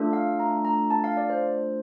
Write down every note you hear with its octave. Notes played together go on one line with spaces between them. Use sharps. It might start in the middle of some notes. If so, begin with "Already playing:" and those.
Already playing: A3 D4 F4 A4
F5
A#5
A#5
A5
F5
D5
C5